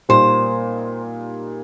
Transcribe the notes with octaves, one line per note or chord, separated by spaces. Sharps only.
A#2 G3 A#3 D#4 C5